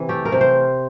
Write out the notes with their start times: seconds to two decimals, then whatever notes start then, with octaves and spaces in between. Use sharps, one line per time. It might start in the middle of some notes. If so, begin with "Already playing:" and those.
Already playing: C3 E3
0.09 A3 G4
0.25 A#4
0.32 C3
0.41 C5